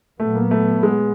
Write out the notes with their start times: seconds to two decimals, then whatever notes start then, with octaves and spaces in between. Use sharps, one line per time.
0.20 A#2 F#3 A3 B3
0.35 A#3
0.51 A3
0.83 G#3